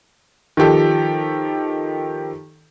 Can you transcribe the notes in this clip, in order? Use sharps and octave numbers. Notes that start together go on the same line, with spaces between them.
D#3 F3 G4 A4